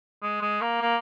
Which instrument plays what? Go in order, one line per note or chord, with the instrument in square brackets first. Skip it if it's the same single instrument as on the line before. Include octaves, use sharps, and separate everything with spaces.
[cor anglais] G#3
G#3
A#3
A#3